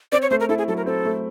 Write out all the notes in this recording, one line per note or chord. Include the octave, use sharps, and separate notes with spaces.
C4 D5
C#5
A3 C5
A#4
E4 A4
G#4
F#3 A4
A#4
C4 A4
A3